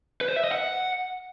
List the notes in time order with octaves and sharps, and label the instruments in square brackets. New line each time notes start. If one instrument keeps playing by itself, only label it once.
[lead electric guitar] B4
C5
E5
D#5
F#5